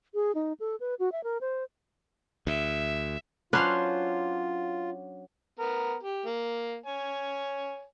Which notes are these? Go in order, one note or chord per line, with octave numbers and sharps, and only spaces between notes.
G#4
D#4
A4
B4
F#4
E5
A#4
C5
D2 E5
F#3 C#4 D4 F4 B4 C5 F5
B3 A#4
G4
A#3
C#5 G#5